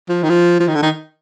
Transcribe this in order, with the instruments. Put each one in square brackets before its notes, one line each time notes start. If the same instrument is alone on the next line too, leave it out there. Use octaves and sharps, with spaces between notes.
[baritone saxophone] F3
D#3
F3
F3
D#3
D3
D#3